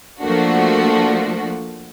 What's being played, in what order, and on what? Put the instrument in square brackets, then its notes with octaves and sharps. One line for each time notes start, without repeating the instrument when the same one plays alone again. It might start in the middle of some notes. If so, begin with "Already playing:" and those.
[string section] F3 A3 A#3 D4 F#4